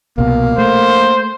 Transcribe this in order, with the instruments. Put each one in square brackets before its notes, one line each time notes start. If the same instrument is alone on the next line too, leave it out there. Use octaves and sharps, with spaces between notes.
[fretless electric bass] C2 B2 [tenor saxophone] A#3
[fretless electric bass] A3 [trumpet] C5